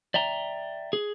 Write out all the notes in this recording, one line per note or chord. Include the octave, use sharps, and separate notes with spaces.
D5 E5 G5 A#5
G#4